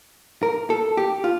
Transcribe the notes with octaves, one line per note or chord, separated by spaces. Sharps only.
A#4
A4
G4
F4